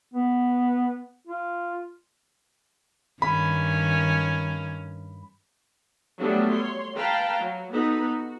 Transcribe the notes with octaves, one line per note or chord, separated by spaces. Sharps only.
B3
F4
G2 D#3 C#4 B5
F#3 G3 A3 B3 D4 F#4
C#5 C6
B4 F5 G5 A5 A#5
F#3
B3 D#4 F#4 A4 B4
F#4